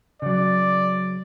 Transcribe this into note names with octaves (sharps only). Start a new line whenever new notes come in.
C#3 F#3 D5